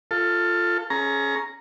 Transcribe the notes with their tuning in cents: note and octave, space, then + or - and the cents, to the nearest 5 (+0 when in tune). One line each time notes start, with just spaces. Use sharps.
F4 +0 A4 +15
C#4 +0 G#4 +25 A#5 +0